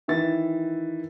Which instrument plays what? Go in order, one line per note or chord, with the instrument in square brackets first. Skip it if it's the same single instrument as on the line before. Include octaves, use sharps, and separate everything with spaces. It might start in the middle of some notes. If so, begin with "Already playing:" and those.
[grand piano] D#3 E3 E5 A6